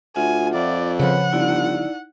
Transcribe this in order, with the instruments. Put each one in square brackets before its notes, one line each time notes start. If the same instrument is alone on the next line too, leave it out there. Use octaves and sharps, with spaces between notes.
[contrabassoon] D2 [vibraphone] F4 E5 F#5 [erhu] G#5
[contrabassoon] F2 [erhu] D5
[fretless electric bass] C#3 F3 [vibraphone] B4 C#5 B5 [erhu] F#5
[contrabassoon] G1 [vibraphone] D#4 E4 D5